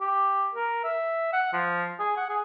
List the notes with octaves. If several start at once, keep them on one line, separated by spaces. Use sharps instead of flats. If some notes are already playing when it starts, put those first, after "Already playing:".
G4
A#4
E5
F#5
F3
G#4
F#5
G#4